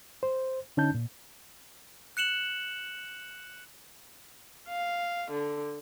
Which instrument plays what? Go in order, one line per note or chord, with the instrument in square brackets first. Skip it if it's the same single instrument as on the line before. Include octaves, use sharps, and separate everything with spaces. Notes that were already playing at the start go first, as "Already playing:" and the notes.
[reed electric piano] C5
D3 C#4 D#4 A5 G6
A#2
[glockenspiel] F#6 C#7 E7 F#7
[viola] F5
D3